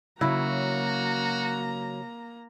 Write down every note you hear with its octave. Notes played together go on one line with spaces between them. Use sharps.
C#3 F#3 A#3 E4 F#4 A#5